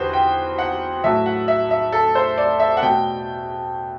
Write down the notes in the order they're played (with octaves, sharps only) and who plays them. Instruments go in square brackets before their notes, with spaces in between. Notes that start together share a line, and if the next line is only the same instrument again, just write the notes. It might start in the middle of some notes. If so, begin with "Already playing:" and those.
Already playing: [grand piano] E2 D3 F#4 G4 B4 C5
G5
F#5
A2 F#3 A3 E5
F#5
E5
E5
A4
C5
D5
E5
F#5
B2 A3 G5